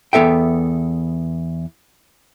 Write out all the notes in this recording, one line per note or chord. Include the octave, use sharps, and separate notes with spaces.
E2 B3 A4 E5 G5